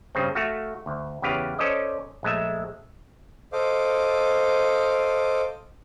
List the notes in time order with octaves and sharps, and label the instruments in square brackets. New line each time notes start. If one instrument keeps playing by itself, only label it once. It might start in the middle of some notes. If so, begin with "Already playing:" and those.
[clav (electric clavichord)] G2 C#3 C4
A3 F#4 F5
D2
E2 C#3 G4 B4 F5
C#4 A4 C5 D5 D#5
A#1 G#3 A3 E5
[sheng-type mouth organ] A4 C5 D#5 F5 D6